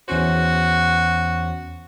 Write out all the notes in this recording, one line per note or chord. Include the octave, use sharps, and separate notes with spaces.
E2 C#4 F#4 C5